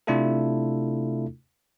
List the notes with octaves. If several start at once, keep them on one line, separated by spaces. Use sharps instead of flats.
C3 A3 D4 E4 F4 A4